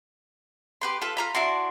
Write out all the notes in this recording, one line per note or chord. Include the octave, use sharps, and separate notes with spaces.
G4 B4 C6
F4 A4 B4
F4 A#5 B5
D4 E4 F#4 C6